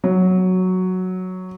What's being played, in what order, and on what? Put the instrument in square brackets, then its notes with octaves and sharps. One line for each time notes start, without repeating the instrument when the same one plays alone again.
[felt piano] F#3